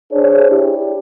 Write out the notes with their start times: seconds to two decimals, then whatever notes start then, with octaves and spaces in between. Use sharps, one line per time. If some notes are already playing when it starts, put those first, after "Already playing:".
0.12 D4 G#4 C5 C#5
0.51 D4 E4 G4